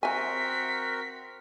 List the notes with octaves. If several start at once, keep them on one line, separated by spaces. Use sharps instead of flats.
C4 F#4 A#4 E5 G#5 B6